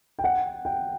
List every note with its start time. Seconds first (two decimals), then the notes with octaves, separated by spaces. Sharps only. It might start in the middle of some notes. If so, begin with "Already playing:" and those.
0.19 G5
0.24 F#5
0.65 G5